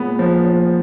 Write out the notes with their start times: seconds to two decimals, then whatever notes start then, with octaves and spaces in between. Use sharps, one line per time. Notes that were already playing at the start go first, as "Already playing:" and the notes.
Already playing: A#2 G#3 B3
0.19 F3
0.45 F3